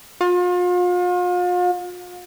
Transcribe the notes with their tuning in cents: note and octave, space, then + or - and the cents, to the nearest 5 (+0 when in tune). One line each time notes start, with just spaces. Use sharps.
F4 +40